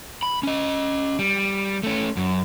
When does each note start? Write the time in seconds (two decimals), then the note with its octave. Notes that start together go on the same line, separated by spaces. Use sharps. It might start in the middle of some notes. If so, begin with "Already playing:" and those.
0.23 B5
0.43 C#4 D#5
1.19 G3
1.83 A3 C#4
2.17 F#2